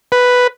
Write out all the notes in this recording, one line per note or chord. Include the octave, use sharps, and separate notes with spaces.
B4